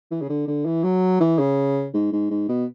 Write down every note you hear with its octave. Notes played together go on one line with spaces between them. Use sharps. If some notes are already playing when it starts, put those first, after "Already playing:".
E3
C#3
D3
D3
E3
F#3
E3
C#3
G#2
G#2
G#2
B2